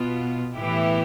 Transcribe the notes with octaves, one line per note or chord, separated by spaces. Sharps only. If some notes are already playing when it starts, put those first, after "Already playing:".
Already playing: B2 B3 F4
A2 E3 B3 E4 G4